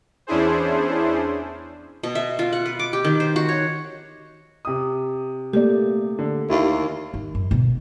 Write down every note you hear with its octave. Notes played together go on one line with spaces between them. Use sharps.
E2 C#4 D4 E4 G#4 C5
B2
E5
F4
F#5
B4
D6
G4
D#3
C5
F#4
C#5
C3 D#6
A3 A#3 G4 D5
D3
D#2 E4
D#3
F#2
B2 D3